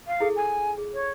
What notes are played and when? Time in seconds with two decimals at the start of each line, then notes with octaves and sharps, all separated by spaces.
0.07 F5
0.20 E4 G#4 A4
0.36 G#5
0.78 G#4
0.94 C#5